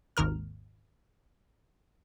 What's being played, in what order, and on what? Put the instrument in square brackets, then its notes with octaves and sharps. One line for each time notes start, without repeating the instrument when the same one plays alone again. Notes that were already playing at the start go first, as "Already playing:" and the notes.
[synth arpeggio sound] G#1 D#2 A#4 F6